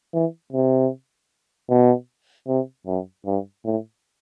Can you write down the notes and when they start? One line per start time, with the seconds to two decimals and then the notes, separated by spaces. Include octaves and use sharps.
0.13 E3
0.53 C3
1.69 B2
2.48 C3
2.87 F#2
3.26 G2
3.65 A2